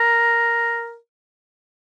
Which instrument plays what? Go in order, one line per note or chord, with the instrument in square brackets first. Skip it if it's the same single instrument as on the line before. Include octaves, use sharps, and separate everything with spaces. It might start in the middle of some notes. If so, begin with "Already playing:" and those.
Already playing: [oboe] A#4